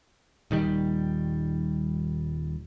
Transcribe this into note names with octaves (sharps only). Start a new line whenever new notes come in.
D#1 D#3 G3